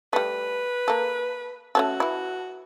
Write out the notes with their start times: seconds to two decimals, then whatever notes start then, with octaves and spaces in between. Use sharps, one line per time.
0.13 G3 A3 B4
0.88 A#3 A4
1.75 A3 C#4 F#4 A4
2.00 E3 E4